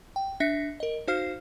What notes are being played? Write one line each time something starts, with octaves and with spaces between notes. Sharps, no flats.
G5
D4 E5 A#6 B6 C#7
A#4 D#5
D#4 F#4 C5 F5 F6 C7